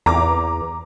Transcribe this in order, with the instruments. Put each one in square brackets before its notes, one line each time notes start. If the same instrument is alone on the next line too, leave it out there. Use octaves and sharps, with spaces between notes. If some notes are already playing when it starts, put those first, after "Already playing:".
[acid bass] E2 [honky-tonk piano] A#5 D6